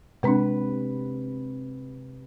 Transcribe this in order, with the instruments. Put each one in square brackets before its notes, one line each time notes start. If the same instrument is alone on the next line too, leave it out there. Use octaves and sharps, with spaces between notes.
[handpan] C3 B4 [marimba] G#3 C4 D4